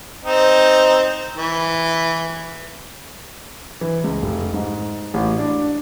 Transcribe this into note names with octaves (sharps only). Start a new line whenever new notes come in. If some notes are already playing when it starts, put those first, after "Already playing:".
C4 D#4
E3
E3
C#2
F1
G#2
A1
D4